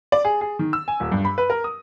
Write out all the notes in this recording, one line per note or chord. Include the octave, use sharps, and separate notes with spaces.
D5
G#4
G#4
D#3
E6
G#5
D#1
G2
B5
B4
A#4
D#6